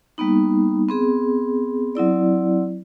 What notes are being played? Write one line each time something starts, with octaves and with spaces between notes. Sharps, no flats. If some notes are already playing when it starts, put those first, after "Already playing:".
G3 A#3 B3 D#4
B3 C4 G#4
F#3 C4 E4 D5